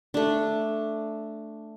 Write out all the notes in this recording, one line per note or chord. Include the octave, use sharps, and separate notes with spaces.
A3 D4